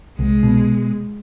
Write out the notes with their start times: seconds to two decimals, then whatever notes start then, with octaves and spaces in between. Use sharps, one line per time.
0.19 C2 G#3
0.43 B2